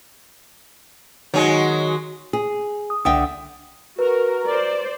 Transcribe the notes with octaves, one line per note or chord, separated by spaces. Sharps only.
D#3 F#3 G#3 D#4 F#4
G#4
D#6
C2 D3 E5 F#5 G5 D#6
F#4 A#4 B4
C5 D5